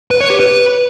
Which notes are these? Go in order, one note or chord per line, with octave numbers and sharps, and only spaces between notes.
B4
C#5
G4
B4